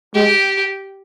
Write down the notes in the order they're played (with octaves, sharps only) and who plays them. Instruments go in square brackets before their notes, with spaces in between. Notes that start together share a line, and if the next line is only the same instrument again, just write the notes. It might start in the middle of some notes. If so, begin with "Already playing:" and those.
[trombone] G#3 [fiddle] G4